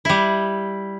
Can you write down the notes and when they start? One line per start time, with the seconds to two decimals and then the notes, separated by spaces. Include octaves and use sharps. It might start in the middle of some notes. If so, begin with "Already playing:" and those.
0.05 G3 E4